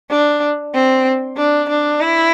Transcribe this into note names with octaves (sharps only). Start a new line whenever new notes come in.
D4
C4
D4
D4
E4